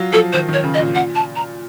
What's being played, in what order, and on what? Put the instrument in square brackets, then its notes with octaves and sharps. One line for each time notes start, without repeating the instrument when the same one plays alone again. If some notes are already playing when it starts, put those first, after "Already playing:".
Already playing: [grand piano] F#3 F4
[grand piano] F3 [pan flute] A4
[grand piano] D#3 [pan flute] C5
[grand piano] D#3 [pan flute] C#5
[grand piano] C#3
[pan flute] D#5
[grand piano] A#2
[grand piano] A#2 [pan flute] F#5
[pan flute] A5
A#5